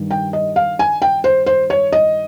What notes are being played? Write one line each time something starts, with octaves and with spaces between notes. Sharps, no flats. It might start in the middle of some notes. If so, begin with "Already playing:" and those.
Already playing: G2 D#3 G3
G5
D#5
F5
G#5
G5
C5
C5
C#5
D#5